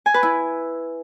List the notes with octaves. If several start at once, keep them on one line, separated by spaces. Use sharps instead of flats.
G#5
B4
E4